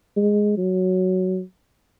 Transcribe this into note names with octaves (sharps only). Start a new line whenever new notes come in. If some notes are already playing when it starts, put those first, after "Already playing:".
G#3
F#3